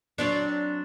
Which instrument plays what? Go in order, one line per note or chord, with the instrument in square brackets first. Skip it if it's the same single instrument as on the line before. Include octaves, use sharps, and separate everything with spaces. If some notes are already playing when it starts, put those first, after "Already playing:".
[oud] F#3 C4 D4